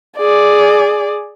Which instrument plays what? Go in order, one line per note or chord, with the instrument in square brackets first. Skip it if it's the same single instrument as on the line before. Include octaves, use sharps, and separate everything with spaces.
[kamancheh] G#4 D5